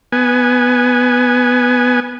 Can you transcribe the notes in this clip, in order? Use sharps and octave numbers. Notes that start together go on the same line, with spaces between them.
B3 G#5